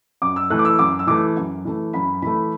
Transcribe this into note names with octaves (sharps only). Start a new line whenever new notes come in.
F#2 D6
E6
E3 A3 F#6
D6
E6
F#2 D6
E6
E3 A3 D6
F#2
E3 A3
F#2 B5
E3 A3 B5